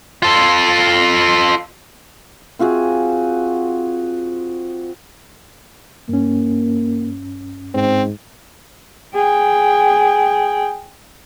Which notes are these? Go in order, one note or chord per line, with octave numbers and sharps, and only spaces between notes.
F4 A4
C4 F4 F#4 G#4
G2 A#3 C#4
G#2 C4
G#4 G5